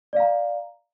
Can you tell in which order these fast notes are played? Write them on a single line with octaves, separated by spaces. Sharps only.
D5 F5 A#5